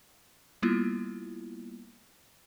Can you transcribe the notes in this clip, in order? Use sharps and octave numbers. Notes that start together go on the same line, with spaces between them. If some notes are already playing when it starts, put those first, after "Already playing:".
G3 A#3 B3 E4 F4